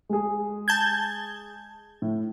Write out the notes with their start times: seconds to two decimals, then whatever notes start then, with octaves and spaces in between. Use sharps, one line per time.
0.09 G#3 G#4
0.68 A5 G6 G#6
2.02 A2